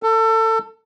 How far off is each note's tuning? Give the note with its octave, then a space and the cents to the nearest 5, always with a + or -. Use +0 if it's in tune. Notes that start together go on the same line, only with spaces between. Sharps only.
A4 +25